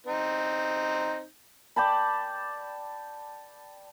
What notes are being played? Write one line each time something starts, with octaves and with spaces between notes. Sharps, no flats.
C4 D#4
D5 G5 A5 B5